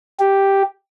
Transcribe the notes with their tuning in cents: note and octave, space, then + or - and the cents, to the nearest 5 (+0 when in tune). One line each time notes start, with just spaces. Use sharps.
G4 +0